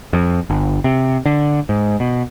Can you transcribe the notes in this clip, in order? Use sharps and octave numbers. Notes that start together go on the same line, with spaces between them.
F2
G1
C3
D3
G#2
B2